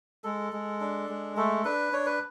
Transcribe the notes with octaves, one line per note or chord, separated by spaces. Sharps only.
G#3 A4
G#3
D4
G#3
A3 A4
D4 B4
D4 C#5
B4